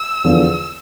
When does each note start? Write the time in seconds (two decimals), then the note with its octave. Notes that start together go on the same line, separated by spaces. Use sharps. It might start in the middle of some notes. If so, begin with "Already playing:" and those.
Already playing: E6
0.24 E2 D3 F3